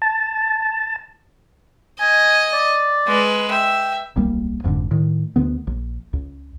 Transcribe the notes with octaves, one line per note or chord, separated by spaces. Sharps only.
A5
D#5 G#5
D5
G#3 B4
E5 G5
D1 B1 G3 A#3
F#1 F2 G#2 D3
A2 D#3
D2 D3 B3
A#1
C#2